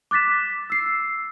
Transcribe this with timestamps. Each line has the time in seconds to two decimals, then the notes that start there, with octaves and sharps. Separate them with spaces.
0.11 D6 F#6 A6 B6 E7
0.70 E6 C7